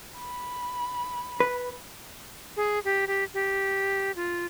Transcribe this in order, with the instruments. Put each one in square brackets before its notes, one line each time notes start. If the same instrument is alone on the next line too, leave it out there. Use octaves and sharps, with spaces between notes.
[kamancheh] B5
[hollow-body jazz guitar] B4
[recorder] G#4
G4
G4
G4
F4